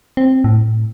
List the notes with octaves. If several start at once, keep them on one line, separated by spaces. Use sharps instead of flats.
C4
A2